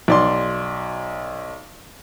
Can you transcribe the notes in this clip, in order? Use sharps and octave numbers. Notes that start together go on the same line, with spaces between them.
B1 D5 C6